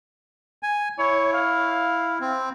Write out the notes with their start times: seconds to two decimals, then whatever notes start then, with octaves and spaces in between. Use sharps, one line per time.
0.63 G#5
0.98 E4 C#5
1.33 F5
2.21 C4